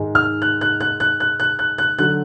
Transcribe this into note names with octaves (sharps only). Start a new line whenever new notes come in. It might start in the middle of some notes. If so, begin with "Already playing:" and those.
Already playing: G#2 D#3 G#3
F6
F#6
F#6
F#6
F#6
F#6
F#6
F#6
F#6
D3 F#3 F#6